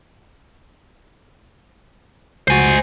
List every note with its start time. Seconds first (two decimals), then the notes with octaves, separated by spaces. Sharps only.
2.48 C#2 F#4 C5 G#5